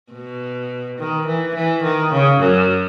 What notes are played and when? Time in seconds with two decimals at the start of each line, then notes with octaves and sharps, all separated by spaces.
0.13 B2
0.98 D#3
1.26 E3
1.55 E3
1.83 D#3
2.12 C#3
2.39 F#2